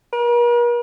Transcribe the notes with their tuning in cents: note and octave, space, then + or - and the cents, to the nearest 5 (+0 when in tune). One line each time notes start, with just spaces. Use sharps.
A#4 +45